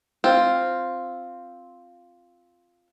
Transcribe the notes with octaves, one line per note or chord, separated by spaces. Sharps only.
C4 F4